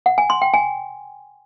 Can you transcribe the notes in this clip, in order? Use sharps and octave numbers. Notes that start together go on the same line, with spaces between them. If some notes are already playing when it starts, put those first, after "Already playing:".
F#5
G#5
C6
G5
G#5